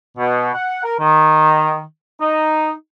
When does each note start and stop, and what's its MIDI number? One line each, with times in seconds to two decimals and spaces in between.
0.18 0.49 47
0.54 0.82 78
0.84 0.96 70
1.00 1.82 51
2.21 2.71 63